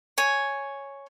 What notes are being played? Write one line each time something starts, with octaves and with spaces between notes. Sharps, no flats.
C#5 G#5